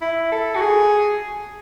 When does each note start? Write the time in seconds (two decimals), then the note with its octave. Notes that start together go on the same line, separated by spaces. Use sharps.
0.01 E4
0.32 A4
0.55 F#4
0.61 G#4